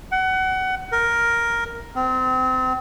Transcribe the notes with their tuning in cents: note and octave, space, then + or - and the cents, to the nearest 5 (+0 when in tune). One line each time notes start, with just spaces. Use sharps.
F#5 +25
A#4 +5
C4 -30